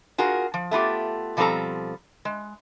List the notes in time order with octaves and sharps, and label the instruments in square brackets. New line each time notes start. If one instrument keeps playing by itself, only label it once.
[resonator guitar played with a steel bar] F4 F#4 G#4 A#4
F3
A3 B3 F4 G4
B2 F3 G3 C4 A4 A#5
G#3